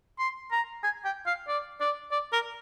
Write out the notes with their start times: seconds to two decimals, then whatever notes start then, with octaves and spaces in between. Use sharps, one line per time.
0.19 C6
0.51 A#5
0.83 G#5
1.05 G5
1.26 F5
1.48 D5
1.80 D5
2.12 D5
2.33 A#4